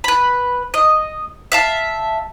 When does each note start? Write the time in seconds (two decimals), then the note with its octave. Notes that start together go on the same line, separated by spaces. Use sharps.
0.04 B4 B5
0.74 D#5
1.52 E5 F5 A5